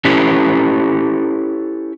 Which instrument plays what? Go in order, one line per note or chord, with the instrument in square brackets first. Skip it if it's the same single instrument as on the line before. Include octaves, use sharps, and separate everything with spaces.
[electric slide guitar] C#4 E4 G4 A4 B4 C#5